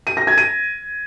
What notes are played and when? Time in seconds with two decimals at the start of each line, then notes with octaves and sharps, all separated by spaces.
0.07 D#7
0.17 A#6
0.27 G#6
0.38 D#7